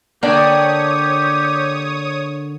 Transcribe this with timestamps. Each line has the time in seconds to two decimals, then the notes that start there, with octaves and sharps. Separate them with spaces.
0.23 D3 A#3 D4 G4 C#5 D5 G5 D#6